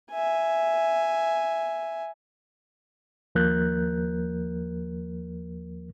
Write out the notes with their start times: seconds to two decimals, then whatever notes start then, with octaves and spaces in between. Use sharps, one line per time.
0.12 E5 G#5
3.35 D#2 F3 A#3 A#4 F#6 G6